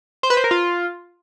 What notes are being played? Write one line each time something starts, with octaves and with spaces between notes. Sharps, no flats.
C5
B4
C5
A#4
F4